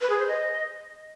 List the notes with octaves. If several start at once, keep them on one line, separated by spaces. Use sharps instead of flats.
B4
G#4
C5
D#5